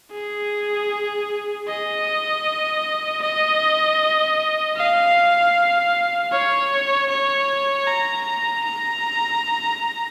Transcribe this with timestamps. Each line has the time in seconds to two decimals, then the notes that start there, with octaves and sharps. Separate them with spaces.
0.13 G#4
1.68 D#5
3.22 D#5
4.77 F5
6.32 C#5
7.09 C#5
7.87 A#5
8.64 A#5